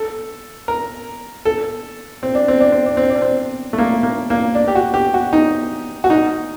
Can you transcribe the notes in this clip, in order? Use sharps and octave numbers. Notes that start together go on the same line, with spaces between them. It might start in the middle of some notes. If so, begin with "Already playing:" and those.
Already playing: A4
A#4
A4
C4
D4
C4
D4
C4
D4
C4
D4
C4
A3
A#3
A#3
A#3
D4
G4
F#4
G4
F#4
D#4
F#4
D#4